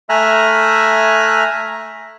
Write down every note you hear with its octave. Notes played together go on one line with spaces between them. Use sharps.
A3 E5 G#5 A#5 F6 F#6